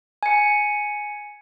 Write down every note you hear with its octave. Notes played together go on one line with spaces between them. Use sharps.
G#5 C#7